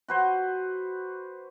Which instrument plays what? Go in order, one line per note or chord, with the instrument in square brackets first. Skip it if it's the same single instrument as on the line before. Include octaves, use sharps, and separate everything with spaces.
[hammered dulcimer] F#4 B4 C5